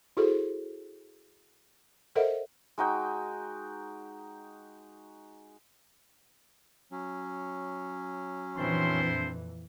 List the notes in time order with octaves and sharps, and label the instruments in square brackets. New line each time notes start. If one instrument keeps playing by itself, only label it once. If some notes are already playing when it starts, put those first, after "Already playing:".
[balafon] E4 F#4 G#4 A4 C5
A4 A#4 C5 D#5 E5 F#5
[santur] G#3 D#4 F#4 G5
[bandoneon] F#3 C#4
[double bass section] F2 A#2 E3 [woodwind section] C4 D4 [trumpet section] E4 C5 C6